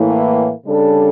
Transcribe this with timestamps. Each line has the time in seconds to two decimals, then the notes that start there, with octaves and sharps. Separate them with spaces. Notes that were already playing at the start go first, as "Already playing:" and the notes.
Already playing: A2 E3 A#3
0.65 C#3 G3 D4 A4